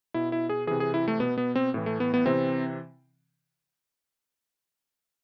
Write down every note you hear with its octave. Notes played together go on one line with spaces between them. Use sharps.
B2 E4
E4
G#4
C3 E3 G#4
G#4
E4
A3
B2 B3
B3
C4
A2 E3
A3
B3
B3
C3 E3 C4